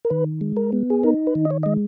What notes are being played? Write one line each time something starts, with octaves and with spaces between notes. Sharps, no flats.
A#4
D#3 B4
G#3
A#4
B3
G#4
D#4 A#4
B4
D#3
D#5
C#5
G#3 D#5